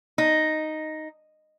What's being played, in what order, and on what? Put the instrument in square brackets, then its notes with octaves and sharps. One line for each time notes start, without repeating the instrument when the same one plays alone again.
[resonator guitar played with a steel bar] D#4